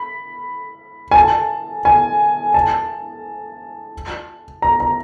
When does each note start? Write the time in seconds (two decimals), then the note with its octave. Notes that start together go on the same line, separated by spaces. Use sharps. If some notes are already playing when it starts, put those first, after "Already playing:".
Already playing: B5
1.11 G#5
1.15 A5
1.85 G#5
2.54 A5
4.62 A#5
4.80 A#5